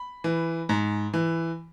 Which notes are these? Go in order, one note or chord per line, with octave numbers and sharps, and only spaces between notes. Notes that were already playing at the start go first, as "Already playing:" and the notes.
Already playing: B5
E3
G#2
E3